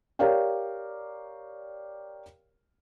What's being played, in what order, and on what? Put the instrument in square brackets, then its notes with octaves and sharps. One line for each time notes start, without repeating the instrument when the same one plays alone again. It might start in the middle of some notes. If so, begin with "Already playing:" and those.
[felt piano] G4 A#4 C#5 D5 F5 G5